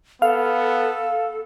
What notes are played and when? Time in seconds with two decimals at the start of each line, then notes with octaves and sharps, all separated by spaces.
0.22 B3 A4 F5